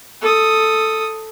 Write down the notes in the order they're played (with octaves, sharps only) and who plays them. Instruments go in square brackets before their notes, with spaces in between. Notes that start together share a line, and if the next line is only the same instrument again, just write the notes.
[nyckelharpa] A4 D#6